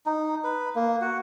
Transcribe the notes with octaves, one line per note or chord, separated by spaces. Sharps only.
D#4
B4
A#3
F#4